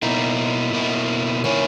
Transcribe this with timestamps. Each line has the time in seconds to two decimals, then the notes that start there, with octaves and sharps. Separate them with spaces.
0.02 B2 A#3 D#4 E4
0.73 B2 A#3 E4
1.44 D#3 A#3 C#4 E4